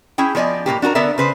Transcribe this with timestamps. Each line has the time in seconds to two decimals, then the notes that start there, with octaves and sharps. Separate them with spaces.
0.18 C#4 E4 G#4 G5
0.35 F3 B3 D5 D#5 G#5
0.66 A2 D#3 A#3 G4
0.82 D4 F#4 G#4 A#4
0.95 D3 B3 A#4 D5 E5
1.18 C#3 B4 C5